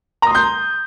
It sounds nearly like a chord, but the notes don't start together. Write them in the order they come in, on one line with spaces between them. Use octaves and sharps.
A#5 D#6 C6 G6